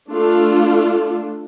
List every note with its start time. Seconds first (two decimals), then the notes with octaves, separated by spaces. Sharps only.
0.11 A3 D4 F4 A4